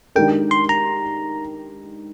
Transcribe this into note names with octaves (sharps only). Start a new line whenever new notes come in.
D#3 G#3 D4 G4 A#4 G5
C6
A#5